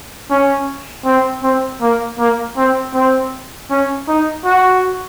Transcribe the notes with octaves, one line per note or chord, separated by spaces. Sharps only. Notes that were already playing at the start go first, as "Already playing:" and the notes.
C#4
C4
C4
A#3
A#3
C4
C4
C#4
D#4
F#4